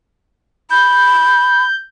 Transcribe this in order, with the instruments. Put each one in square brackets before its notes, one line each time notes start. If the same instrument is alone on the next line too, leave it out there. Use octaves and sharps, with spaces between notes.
[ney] B5 [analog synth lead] G6